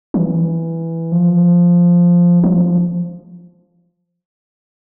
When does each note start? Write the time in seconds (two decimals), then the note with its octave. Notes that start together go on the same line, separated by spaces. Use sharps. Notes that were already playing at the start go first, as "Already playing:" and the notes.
0.14 E3
1.12 F3
2.43 F3